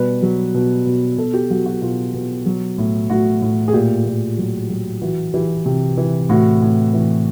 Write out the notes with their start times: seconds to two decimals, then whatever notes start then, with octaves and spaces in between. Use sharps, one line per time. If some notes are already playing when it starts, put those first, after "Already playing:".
Already playing: B2 G3 B4
0.22 F#3
0.54 B2
0.86 B2
1.18 B2 A4
1.34 G4
1.50 F#3 F#4
1.66 F#4
1.82 B2 F4
2.14 B2
2.46 F#3
2.78 A2
3.10 A2 F#4
3.42 A2
3.68 G#4
3.73 A#2 G4
4.06 A#2
4.38 F#3
4.69 F#3
5.02 E3 F#4
5.34 E3 G4
5.66 C3
5.97 E3
6.29 A2 F#4
6.62 A2
6.93 E3